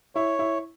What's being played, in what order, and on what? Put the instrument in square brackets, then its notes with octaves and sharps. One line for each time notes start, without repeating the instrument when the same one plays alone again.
[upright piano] E4 [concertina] C#5
[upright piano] E4